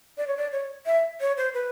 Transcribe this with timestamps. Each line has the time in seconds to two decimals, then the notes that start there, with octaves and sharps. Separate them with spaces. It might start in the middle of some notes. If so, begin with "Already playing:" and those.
0.18 D5
0.27 C#5
0.37 D5
0.52 C#5
0.86 E5
1.21 C#5
1.37 C5
1.54 B4